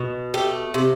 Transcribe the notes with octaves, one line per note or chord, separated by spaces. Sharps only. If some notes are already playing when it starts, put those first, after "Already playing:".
Already playing: B2
A3 G4
C3